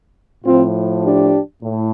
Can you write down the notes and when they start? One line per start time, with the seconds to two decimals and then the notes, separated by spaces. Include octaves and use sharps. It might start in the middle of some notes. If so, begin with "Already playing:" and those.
0.43 A2 F3 C4 F4
1.03 D4 G4
1.62 A2